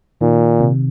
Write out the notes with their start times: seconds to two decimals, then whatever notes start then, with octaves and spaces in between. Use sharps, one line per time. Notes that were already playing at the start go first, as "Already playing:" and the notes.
0.21 A#2 D#3
0.60 C3